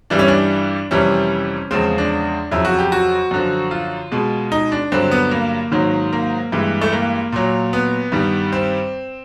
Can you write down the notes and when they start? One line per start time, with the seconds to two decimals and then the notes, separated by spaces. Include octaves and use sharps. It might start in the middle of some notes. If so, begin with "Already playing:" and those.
0.10 G2 E3 G3 D4
0.19 C#4
0.28 D4
0.91 F2 C3 E3 G3 C#4
1.71 E2 C#3 F3 G#3 C4
1.98 D4
2.51 F2 C#3 F#3 E4
2.65 F#4
2.79 G4
2.92 F#4
3.31 F#2 D3 F3
3.71 F4
4.12 B2 G#3
4.52 D#4
4.72 D4
4.92 G2 D3 F#3 C4
5.11 B3
5.31 A#3
5.72 G#2 D#3 F#3
6.13 A#3
6.52 G2 E3 G#3
6.82 A3
6.93 A#3
7.32 A#2 F#3
7.73 B3
8.12 G2 D#3 G3
8.52 C4